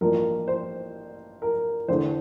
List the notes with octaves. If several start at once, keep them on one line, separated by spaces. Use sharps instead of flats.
A1 G2 F3 A#3 A#4
C5
A#4
E2 D3 A3 C5